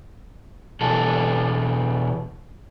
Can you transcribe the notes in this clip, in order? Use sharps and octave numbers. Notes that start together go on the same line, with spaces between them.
B2 E3 A4